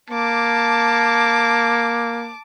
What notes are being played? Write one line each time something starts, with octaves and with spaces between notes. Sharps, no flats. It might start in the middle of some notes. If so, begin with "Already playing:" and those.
A#3 A5 D6